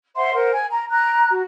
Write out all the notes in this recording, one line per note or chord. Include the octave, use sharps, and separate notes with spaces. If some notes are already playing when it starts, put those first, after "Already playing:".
C5 E5 F#5 C6
A#4 C5 F#5
G#5
A#5
A#5 F#6
F#4